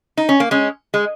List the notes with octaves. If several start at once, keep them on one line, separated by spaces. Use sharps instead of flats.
D#4
C#4
A#3
G#3 C#4
G#3